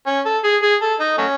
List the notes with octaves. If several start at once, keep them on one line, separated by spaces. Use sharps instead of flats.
C#4
A4
G#4
G#4
A4
D#4
F#3 A3 C#4